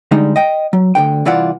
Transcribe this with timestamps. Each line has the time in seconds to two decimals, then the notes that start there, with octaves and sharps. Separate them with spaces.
0.11 D3 G3 G#3 D#4
0.36 D#5 G5
0.73 F#3
0.95 D2 A#2 D3 G5
1.25 C2 E3 E4 F4 D5 F#5